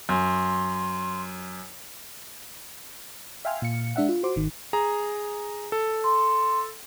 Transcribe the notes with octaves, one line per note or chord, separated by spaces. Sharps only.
F#2 C6
E5 F5 G5 G#5 C6 F6
A#2 F5 C#7
G#3 D4 E5 F#5
F4
F#4 C5 C6 D6
G#1 D#3
G#4 A#5
A4
C6